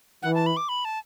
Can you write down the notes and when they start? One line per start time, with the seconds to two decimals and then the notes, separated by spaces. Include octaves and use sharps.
0.23 E3 F#5
0.35 A5
0.46 B5
0.57 D6
0.69 B5
0.85 A5